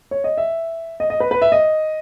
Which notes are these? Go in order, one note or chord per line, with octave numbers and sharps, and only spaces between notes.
C#5
D#5
E5
D#5
D#5
B4
B4
E5
D#5